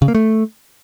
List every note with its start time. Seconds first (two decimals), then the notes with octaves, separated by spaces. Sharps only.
0.02 C#3
0.08 A#3
0.15 A3